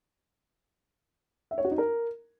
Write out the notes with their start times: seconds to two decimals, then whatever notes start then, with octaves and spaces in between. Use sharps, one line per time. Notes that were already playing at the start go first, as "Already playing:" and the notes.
1.51 E5
1.58 C#5
1.65 F#4
1.71 D#4
1.78 A#4